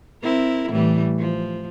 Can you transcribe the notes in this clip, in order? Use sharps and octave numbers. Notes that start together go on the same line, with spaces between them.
C4 E4 A#4
A2 E3 G3
F3